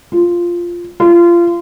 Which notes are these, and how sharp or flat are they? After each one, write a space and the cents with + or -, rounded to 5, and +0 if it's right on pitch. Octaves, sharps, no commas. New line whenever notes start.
F4 -5
F4 -25